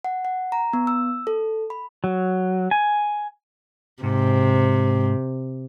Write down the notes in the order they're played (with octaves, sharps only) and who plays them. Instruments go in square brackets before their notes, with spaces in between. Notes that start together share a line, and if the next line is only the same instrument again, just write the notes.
[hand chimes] F#5
F#5
A#5
B3
E6
A4
B5
[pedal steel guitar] F#3
G#5
[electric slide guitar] G#2 [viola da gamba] C3